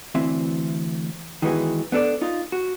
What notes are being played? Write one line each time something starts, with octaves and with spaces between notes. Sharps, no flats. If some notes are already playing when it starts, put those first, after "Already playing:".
D2 E3 C4 E5
D#3 E3 G#3 B3 F#4 G#4
B3 D4 A4 D5
D#4 F4
F#4